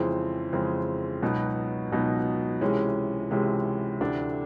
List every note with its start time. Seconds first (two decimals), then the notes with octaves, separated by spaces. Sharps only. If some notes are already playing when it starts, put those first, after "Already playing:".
Already playing: F2 C#3 E3 G#3 C4
0.53 F2 C#3 E3 G#3 C4
1.22 C#2 B2 F#3 B3 D#4
1.92 C#2 B2 F#3 B3 D#4
2.61 C#2 C3 E3 G#3 C#4
3.31 C#2 C3 E3 G#3 C#4
4.01 D2 C3 E3 A3 D4